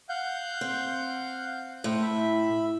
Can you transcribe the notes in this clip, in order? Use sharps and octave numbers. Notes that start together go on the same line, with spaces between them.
F5 F#5 G6
C4
A2 C5
E5 B5